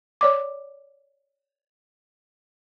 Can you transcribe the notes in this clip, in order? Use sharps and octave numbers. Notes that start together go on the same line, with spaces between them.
C#5 D5 D6